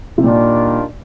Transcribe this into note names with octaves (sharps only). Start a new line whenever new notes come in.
C3
A#2 D#3 G3 D4 F4